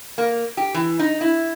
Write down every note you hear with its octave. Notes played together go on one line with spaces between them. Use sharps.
A#3
G4
E3
D#4
E4